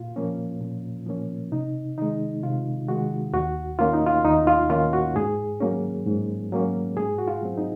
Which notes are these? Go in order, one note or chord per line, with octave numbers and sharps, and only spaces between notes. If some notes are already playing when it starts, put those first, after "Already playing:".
Already playing: A#2 F4
F3 A#3 C#4
A#2
F3 A#3 C#4
C3 D#4
D#3 G#3 D#4
C3 F4
D#3 G#3 F#4
D#2 F#4
D#3 A#3 C#4 F4
D#4
F4
D#2 D#4
F4
D#3 A#3 C#4 F4
F#4
G#2 G#4
F#3 A#3 C#4
G#2
F#3 A#3 C#4
G#2 G#4
F#4
F4
F#3 C4
D#4